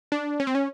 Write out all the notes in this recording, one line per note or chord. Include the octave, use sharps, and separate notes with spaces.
D4
C#4
C4
C#4